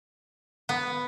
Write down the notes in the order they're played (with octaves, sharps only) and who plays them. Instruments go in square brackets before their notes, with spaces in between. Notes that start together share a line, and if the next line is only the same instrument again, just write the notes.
[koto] B3